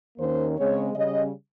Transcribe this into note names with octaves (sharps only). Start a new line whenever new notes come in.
D#2 D#3 A#3 C#4 C5
C#3 G#3 C4 C#5
C#3 G3 C#4 D#5